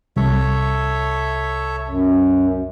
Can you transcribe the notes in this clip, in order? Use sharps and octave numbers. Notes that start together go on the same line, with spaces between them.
C2 A4 C#5 E5
F#2